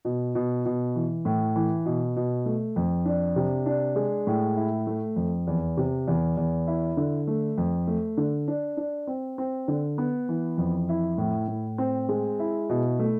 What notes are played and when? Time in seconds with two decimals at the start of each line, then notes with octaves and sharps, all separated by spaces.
0.05 B2
0.35 B2
0.66 B2
0.95 E3
1.25 A2
1.56 E3
1.86 B2
2.16 B2
2.46 A3
2.76 F2
3.05 D4
3.36 C3
3.66 D4
3.96 G#3
4.27 A2
4.56 E4
4.87 A3
5.16 F2
5.47 E2
5.77 C3
6.07 E2
6.37 E2
6.67 E4
6.97 D3
7.27 A3
7.58 F2
7.87 A3
8.17 D3
8.48 D4
8.77 D4
9.07 C4
9.38 C4
9.68 D3
9.98 B3
10.29 E3
10.58 F2
10.89 E4
11.18 A2
11.48 A2
11.78 C4
12.09 G#3
12.39 E4
12.69 B2
12.99 A3